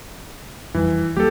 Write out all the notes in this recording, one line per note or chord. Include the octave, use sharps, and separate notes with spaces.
F2 E3 G3
D2 G3 A#3 G4 A4